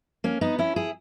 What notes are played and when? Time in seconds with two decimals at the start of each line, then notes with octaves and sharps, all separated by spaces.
0.24 A#3 C#4
0.41 B3 D#4
0.59 C#4 E4
0.76 E4 G#4